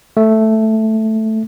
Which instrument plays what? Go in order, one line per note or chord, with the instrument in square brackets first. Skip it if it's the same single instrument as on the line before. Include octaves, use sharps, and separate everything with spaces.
[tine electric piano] A3